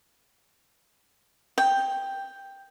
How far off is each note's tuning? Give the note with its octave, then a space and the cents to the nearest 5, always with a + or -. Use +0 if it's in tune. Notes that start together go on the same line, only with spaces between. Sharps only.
G5 +5